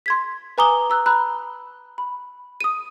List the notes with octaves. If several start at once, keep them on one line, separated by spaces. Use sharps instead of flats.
C6 G#6 B6
B4 G#5 A#5 D6 D#6 G7
A#5 E6 F#6
A#5 B5 F#6
B5
D#6 D#7